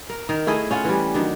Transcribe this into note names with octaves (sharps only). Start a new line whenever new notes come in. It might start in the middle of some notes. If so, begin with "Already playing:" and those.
A#4
D#3 A#4
A3 E4 G#4 D#5
C#4 F4 F#5
E3 G3
D#3 F#3 D4